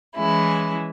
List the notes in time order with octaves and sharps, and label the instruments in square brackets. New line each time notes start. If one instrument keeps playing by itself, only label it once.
[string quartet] E3 G#3 C#4 E4